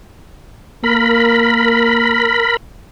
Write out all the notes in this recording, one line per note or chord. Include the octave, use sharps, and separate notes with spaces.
A#3 A#4 B5